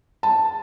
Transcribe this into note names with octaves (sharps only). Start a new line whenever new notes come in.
A5